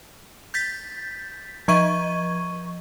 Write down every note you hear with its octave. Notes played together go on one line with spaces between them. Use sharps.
G6 A6 B6
F3 D#5 C#6 G#6 D#7